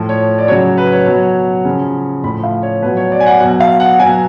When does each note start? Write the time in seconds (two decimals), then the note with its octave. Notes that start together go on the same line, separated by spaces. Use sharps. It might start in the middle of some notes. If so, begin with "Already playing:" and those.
Already playing: A2 F3
0.09 C#5
0.38 D5
0.48 C#3 F#3 C#5
0.77 B4
0.92 C#5
1.06 B2 F#3
1.65 C#3 F3
2.23 A2 F3 B5
2.43 F5
2.63 C#5
2.82 B2 B4
2.85 F#3
2.97 C#5
3.12 D5
3.20 G#5
3.26 F#5
3.40 B2 F#3 F#5
3.60 F5
3.80 F#5
3.99 F#3 G#5
4.04 B2